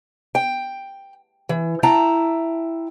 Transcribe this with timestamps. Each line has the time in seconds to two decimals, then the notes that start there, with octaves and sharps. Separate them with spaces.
0.35 G5
1.49 E3
1.83 E4 E5 G5 A5 A#5